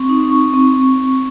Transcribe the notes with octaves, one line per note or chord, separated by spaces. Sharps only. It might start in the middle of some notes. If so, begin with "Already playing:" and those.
Already playing: C4 C#6
D#4
C4 C#6
C4
C4
C4